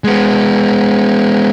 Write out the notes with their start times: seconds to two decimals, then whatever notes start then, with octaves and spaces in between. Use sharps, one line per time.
0.04 G#3 B3